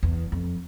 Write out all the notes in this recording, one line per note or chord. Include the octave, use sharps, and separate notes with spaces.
E2
F2